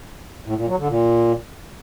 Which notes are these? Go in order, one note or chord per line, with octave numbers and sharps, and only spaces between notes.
A2
A#2
F#3
D3
A#2